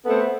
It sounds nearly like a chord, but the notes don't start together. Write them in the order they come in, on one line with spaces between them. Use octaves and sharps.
A4 B3 A3 C4